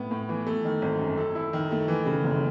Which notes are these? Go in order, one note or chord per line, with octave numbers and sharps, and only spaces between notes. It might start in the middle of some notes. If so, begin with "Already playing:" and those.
Already playing: A2 B3
A2
E3
A3
D#3
G#1
F#2
A4
E4
D#3
A3
E3
C#3
F#1